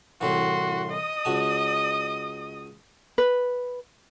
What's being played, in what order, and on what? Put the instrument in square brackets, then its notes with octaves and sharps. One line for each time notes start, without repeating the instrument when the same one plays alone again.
[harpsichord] C2 A2 E3 [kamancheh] F#4 C6
[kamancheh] D#5 D#6
[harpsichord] C#2 F#4 A5
[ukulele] B4